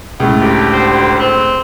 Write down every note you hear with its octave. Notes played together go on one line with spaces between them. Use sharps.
C#2 A2
D2 G4
C5
C4